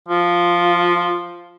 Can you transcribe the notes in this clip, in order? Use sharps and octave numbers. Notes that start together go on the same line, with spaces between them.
F3 F4